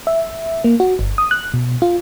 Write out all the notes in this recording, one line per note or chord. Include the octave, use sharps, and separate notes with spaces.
E5
A#3
F#4
G1
D#6
F#6
B2
F4